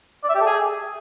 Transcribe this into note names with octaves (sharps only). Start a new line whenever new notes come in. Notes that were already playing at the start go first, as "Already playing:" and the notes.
D5
E5
G4
A4
G#4